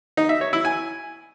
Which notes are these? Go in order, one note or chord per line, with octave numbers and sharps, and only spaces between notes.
D#4
E5
C#5
E4
G#5